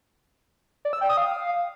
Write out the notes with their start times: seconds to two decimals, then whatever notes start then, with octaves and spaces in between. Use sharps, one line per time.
0.85 D5
0.93 E6
1.01 G5
1.09 D#6
1.17 F5